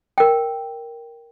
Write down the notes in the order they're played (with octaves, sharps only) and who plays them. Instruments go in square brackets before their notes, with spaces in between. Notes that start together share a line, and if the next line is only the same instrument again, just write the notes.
[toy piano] A#4 G5